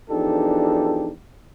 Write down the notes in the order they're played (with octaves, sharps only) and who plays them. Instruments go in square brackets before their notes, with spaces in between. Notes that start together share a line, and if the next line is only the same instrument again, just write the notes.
[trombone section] E2 F3 D4 D#4 G4 A4